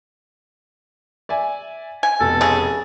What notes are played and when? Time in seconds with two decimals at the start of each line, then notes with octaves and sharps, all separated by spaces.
1.29 D5 E5 G#5
2.03 G#5
2.20 F1 B2 A4
2.41 C#3 G#4